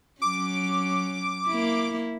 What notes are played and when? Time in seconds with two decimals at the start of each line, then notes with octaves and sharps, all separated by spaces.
0.22 F#3 C#4 D6
1.48 A#3 E4